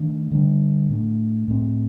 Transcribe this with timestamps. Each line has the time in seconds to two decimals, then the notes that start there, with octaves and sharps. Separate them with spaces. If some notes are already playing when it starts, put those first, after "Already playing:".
Already playing: D#3 A3 D4
0.31 D3 G3 D4
0.89 A2 A3 D4
1.48 A2 A3 C4